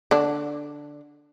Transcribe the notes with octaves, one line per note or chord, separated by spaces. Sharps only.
D3 D4